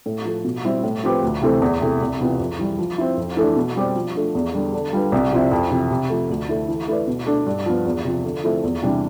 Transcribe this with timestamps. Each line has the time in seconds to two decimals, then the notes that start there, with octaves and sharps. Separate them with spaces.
0.06 A2
0.25 F3 A3
0.44 B2
0.64 G3 C4 E4
0.83 A2
1.03 F3 C4 G4 B4
1.23 D2
1.42 C3 E3 A3 C4
1.62 E2
1.81 C3 E3 A3
2.01 C2
2.20 C3 E3 B3 F4
2.39 F2
2.59 E3 G3
2.79 F3
2.98 C4 E4
3.17 F2
3.37 E3 A3 D4
3.56 B2
3.76 G3 C4 G4 D5
3.96 F3
4.15 A3 D4
4.35 E2
4.54 D3 G3 D4
4.73 D3
4.93 G3 D4 F4 B4
5.12 C2
5.32 C3 F3 C4 E4
5.52 F2
5.71 C3 E3
5.91 C3
6.10 F3 A3
6.29 D2
6.49 D3 A3 E4
6.69 E3
6.88 A3 E4 B4 D5
7.07 B2
7.27 A3 D4
7.46 G2
7.66 F3 B3
7.85 E2
8.04 C3 F3
8.25 D3
8.44 F3 A3 C4 E4
8.63 E2
8.83 C3 E3 G3 D4